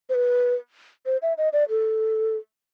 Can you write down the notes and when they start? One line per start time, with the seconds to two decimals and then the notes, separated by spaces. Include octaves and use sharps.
0.10 C5
0.14 B4
1.06 C5
1.22 E5
1.38 D#5
1.53 D5
1.70 A4